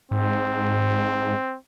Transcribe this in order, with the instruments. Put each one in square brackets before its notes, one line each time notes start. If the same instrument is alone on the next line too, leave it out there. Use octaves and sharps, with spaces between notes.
[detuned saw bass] G#2 [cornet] C4